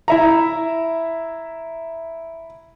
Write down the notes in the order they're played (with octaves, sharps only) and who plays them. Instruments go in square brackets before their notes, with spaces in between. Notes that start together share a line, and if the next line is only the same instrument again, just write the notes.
[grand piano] E4 E5 A#5